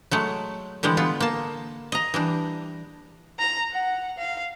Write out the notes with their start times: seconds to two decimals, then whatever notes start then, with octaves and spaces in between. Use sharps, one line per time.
0.11 F#3 G#3 A3
0.83 D3 E3 G3 G#3
0.97 B3 F4
1.20 A#3 A5
1.92 D#5 A#5
2.14 E3 G3 D4
3.39 A#5
3.71 F#5
4.18 F5